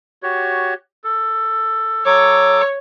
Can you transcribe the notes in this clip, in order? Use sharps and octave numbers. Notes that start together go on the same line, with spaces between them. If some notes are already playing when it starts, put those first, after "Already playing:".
F#4 G4 C#5
A4
F#3 A4 C#5 D6